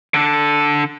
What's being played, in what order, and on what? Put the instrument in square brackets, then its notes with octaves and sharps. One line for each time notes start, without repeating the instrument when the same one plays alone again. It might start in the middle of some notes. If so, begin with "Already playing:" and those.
[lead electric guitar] D3 A4